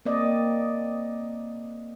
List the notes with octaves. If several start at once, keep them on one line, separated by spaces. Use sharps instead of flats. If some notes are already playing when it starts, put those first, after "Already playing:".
A#3 C4 D5 D#5